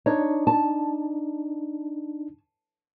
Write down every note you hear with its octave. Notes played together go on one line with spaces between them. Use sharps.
D4 D#4 C#5
A5